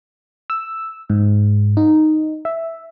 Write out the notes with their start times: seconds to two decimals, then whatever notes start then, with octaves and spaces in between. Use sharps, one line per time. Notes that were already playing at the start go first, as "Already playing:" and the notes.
0.50 E6
1.10 G#2
1.77 D#4
2.45 E5